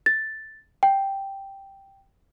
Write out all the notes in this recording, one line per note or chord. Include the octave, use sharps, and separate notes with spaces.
A6
G5